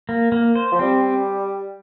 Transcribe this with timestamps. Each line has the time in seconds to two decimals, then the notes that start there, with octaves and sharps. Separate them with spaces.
0.09 A#3
0.32 A#3
0.55 C5
0.71 F3
0.79 G3 C4